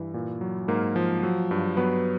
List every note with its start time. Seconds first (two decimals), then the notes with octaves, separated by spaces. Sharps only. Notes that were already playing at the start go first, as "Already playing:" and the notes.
Already playing: G2 E3
0.14 A#2
0.41 F#3
0.68 G#2 A#3 A#4
0.96 F3
1.23 F#3
1.51 G2
1.77 F#3 B3 B4